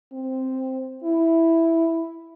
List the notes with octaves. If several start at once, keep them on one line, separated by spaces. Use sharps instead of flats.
C4
E4